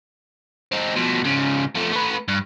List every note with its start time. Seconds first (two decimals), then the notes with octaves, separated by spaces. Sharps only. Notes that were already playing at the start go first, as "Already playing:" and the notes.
0.72 C4 D#4
0.96 B2 F3
1.24 G#2 C#3
1.75 F3 A3
1.93 A3 B4
2.28 G2